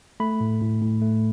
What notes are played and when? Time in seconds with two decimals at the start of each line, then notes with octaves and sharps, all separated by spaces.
0.20 A3 B5
0.40 A2
0.61 A2
0.82 A2
1.02 A3